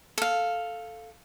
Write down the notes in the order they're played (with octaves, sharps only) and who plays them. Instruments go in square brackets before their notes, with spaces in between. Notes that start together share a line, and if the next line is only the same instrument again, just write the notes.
[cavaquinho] A4 F5